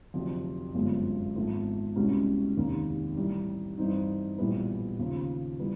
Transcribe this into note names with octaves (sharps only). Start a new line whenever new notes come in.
F1 F2 D3 F#3 A3
G1 F#2 D3 F3 G#3
G#1 G#2 F3 A3
C2 B2 G#3 C#4 F#4
F1 D#2 D#3
A2 E3 G3
G2 E3 G3 C4 D#4
A#1 A2 E3 G3 B3
D#2 C#3 F3
E3 G3 B3